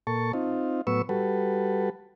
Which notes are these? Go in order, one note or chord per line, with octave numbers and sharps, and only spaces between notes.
A#2 A4 A5 C#6
C4 D#4 F4
A2 F#3 B3 B4 C#6 E6
G3 F#4 A4 B4